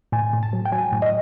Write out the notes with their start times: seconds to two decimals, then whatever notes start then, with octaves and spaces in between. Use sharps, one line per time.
0.12 A2 G#5
0.33 A2
0.43 A5
0.53 F#3
0.65 G5
0.72 F#3 G#5
0.92 A2
1.02 D#5